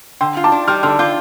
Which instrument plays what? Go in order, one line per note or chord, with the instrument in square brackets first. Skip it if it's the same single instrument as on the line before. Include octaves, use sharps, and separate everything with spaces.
[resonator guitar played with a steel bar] D3 [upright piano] G5 C6
[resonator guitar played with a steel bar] F4
[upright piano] A5 D6
[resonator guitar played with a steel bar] D4
[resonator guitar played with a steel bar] G3 [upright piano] C6 F6
[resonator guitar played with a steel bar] D3 [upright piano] C6 F6
[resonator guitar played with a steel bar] F4 [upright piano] D6 G6